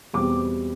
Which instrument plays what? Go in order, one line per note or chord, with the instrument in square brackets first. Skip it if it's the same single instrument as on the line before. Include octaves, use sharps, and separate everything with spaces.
[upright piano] E2 B2 G3 C4 D6